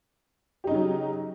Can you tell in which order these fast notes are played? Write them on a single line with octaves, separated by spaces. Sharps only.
G4 D#4 C#3 F#3